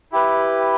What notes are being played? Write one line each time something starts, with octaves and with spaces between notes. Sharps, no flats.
E4 G4 B4